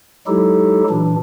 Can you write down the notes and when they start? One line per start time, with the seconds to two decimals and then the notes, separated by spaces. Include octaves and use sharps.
0.27 F#3 G#3 D#4 E4 G4 A4
0.90 A#2 E3 D4